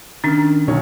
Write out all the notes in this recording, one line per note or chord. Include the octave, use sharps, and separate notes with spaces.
D#3 C#4 D4 F6
B1 D#3 C#5